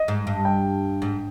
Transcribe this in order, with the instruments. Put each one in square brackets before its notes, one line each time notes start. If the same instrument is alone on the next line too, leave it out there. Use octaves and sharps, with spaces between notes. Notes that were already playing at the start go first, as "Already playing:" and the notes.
Already playing: [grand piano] D#5
[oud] G#2
G2
[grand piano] G5
[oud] G#2